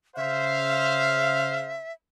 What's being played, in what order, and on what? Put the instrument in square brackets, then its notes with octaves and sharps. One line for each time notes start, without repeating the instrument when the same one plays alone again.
[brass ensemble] C#3 C5 F5 [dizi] E5